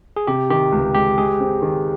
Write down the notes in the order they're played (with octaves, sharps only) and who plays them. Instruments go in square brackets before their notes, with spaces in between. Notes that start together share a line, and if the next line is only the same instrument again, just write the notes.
[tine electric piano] G#4
[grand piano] C3 [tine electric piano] G4
[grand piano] D#3 [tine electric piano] G4
[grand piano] C#2
[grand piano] G#3 [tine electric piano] G4
[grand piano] G#3 [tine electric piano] G#4
[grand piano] C4
D#3